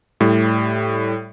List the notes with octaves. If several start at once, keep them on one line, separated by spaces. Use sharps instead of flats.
A2 G3